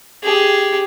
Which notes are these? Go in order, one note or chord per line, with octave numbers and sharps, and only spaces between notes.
G4 G#4